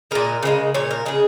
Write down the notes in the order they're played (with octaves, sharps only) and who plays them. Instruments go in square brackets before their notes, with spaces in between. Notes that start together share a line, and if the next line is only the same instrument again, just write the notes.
[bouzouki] A#2 G#3 A#4
C#3 F3 G#3
A#2 F3 C#5
A#4
C#3 G#3 G#4